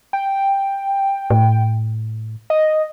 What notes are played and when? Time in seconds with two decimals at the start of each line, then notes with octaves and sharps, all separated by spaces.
0.13 G5
1.30 A2
2.50 D#5